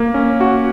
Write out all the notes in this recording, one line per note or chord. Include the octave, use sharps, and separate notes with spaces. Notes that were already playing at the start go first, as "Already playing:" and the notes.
Already playing: A#3
C#4
F#4